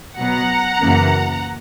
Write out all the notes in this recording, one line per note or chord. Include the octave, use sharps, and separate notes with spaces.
B2 F#3 B3 F#5 A#5
F#2 C#3 E3 A#3